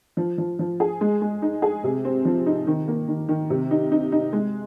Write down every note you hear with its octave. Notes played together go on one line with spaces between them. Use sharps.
F3
F3
F3
G#4
G#3
G#3
D#4
G#4
C3
C4
F3
D#4
D#3
A#3
D#3
D#3
C3
D#4
D#4
D#4
G#3